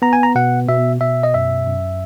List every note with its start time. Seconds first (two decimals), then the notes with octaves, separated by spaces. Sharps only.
0.02 B3 A#5
0.13 G#5
0.23 A#5
0.35 B2 F#5
0.69 B2 E5
1.01 B2 E5
1.23 D#5
1.34 F#2 E5
1.67 F#2